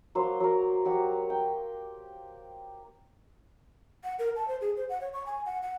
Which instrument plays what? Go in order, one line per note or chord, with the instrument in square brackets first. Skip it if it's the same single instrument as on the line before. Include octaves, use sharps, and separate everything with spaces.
[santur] F#3 A#3 C5
F#3 A#4
F#3 G4 F#5
G5
[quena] F#5
A#4
A5
C5
G#4
C5
F#5
C#5
C#6
G#5
F#5
F#5